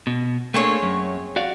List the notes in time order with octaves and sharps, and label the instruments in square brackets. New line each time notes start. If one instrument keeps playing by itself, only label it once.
[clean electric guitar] B2
[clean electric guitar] A3 A#3 D4 [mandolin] C4 G#4 C#5
[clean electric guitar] F#2
F#4 D5 F5